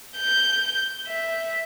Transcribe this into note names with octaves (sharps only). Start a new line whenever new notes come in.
G6
E5